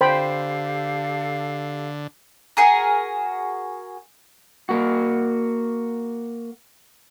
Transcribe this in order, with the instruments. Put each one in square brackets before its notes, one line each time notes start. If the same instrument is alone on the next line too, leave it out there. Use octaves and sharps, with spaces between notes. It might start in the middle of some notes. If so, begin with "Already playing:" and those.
[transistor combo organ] D3 [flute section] G4 A4 F5 [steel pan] C5 G5 B5
[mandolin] F#4 G#4 A#4
[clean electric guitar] A#3 F#4